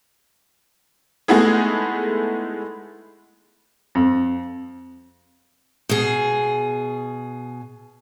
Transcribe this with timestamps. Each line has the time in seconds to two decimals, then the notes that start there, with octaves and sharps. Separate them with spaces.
1.28 G#3 A3 B3 D#4 E4 G#4
3.95 F2
5.89 B2 G#4